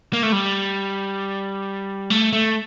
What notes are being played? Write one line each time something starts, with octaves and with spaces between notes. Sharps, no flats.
A#3
A3
G3
A3
A3